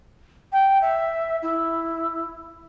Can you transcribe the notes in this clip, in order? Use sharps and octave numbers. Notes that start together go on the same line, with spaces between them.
G5
E5
E4